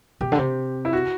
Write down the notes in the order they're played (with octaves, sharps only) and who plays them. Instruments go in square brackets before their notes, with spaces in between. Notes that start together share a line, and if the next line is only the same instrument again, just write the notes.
[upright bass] B2 [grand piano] G4
[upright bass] D3
C3
[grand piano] E4
F#4